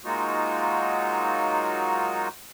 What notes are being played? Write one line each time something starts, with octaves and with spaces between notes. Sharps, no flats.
F#3 G#3 A#3 D#4 F4 F#4